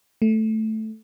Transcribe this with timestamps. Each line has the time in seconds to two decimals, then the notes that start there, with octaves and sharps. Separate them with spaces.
0.22 A3